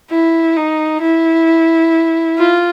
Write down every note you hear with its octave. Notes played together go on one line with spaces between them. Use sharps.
E4
D#4
E4
F4